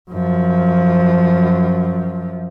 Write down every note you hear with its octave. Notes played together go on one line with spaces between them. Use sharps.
F#2 F3